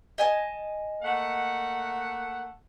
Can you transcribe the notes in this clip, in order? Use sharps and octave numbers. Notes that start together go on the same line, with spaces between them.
D#5 G#5 A5
A3 A#3 F#5